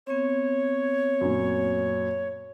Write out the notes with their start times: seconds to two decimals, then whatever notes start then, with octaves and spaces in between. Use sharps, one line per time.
0.07 B3 C4 C#5
1.21 F#2 A#2